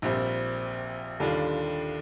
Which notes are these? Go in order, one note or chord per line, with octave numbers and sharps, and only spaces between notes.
A#1 A#2 G3 C4
D#2 D3 G3 D4 F4